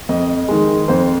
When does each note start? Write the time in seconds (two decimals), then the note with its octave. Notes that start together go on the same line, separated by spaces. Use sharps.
0.09 F2 D#5
0.48 D#3 G#3
0.88 F2 C5